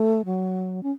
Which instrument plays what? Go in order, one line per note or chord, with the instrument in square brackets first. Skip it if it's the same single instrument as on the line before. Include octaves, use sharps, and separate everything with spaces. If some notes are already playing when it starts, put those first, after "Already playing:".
Already playing: [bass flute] A3
F#3
C#4